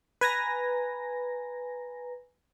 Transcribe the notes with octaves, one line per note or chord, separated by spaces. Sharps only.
B4 G#5 A#5 A#6